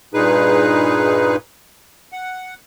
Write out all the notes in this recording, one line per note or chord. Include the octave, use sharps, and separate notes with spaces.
G2 A#2 D#4 G#4 B4
F#5